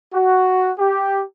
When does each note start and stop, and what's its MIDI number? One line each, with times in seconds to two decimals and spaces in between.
0.14 0.71 66
0.79 1.22 67